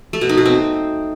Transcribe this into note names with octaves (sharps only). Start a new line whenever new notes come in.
A3
B2
D#4
B2
C4